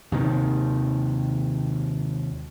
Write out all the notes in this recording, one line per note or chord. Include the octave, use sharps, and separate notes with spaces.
D#2 C3 D#3